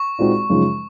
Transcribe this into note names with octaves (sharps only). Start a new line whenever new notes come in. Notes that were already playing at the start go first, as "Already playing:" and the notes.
Already playing: C#6
A#2 G#3 C4 D#4 F#4
F#2 C#3 F3 G#3 D#4